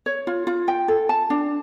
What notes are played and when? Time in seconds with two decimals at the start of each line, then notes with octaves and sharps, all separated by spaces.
0.06 C#5
0.27 F4
0.47 F4
0.68 G5
0.88 A4
1.09 A5
1.30 D4